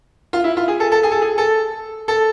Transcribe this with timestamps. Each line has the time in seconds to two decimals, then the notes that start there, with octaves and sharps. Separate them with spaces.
0.33 F4
0.44 E4
0.57 F4
0.68 G#4
0.80 A4
0.92 A4
1.03 G#4
1.11 A4
1.22 G#4
1.38 A4
2.08 A4